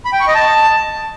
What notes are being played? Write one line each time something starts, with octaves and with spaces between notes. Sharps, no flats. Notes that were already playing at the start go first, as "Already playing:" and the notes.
B5
G5
C#6
D#5
A5